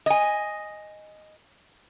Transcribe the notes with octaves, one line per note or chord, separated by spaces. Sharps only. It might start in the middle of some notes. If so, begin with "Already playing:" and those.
D#5 G#5